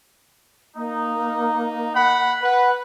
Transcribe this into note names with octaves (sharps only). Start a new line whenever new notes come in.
A#3 D#4
F#5 B5
B4 F#5